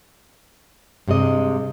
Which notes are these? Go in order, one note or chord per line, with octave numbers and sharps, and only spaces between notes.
G2 C3 G#3 D#5